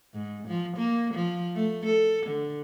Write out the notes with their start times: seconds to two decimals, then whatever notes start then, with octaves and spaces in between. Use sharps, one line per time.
0.14 G#2
0.48 F3
0.78 A#3
1.14 F3
1.55 A3
1.86 A4
2.27 D3